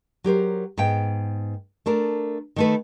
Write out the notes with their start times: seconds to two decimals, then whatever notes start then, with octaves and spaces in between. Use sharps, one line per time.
0.24 F#3 G4 A#4 C5
0.77 G#2 B3 G5
1.86 A3 D4 A#4
2.56 D#3 A3 B4